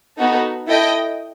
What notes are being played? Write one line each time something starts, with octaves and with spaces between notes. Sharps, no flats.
B3 D#4 F#4 A4
E4 A4 D#5 G5